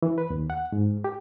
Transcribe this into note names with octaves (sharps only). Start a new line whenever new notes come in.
E3
B4
D#2
F#5
G#2
G4